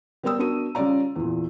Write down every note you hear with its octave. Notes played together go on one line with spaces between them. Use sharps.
G3 B3 A#4 G5 D#6 E6
B3 D4 F#4 A#4 D#7
C#3 G3 C#4 F4 D5 A#5
E2 A#2